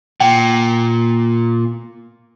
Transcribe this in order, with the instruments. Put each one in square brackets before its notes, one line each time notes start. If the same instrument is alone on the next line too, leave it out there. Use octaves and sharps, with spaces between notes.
[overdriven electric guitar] A#2 [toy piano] G5